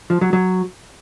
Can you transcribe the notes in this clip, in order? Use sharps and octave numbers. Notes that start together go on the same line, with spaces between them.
F3
F#3
F#3